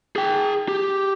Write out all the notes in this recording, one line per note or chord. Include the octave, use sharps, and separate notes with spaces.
G#4 G5
G4